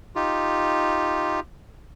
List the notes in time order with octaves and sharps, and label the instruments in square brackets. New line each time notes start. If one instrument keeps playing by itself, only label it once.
[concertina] D#4 F4 G4